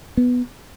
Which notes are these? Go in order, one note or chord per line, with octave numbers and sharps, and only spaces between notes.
B3